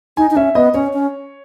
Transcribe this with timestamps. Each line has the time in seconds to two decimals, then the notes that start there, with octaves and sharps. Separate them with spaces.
0.17 D#4 G#5
0.31 D#4
0.36 C#4 E5
0.55 B3 D#5
0.74 C#4 C#5
0.93 C#4